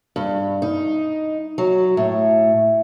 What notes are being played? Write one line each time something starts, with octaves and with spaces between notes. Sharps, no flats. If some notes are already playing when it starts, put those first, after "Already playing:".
G2
D#4
F#3
A2